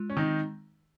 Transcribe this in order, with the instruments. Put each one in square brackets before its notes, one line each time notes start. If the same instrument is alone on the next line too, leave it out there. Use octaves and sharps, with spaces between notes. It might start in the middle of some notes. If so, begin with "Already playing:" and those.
Already playing: [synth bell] G#3 F4
[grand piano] C#4
[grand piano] D#3 D#4 [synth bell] C4